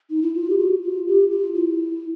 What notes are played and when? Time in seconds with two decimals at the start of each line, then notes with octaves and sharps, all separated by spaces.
0.10 D#4
0.22 E4
0.34 F4
0.50 G4
0.58 F#4
0.82 F4
1.08 G4
1.31 F4
1.55 E4